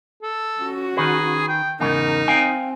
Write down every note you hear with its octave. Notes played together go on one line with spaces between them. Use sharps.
A4
C#4 F#4
D#3 G#4 B4
G5
E2 G#2 C#3 D#4 A#4
C4 F5 G5 G#5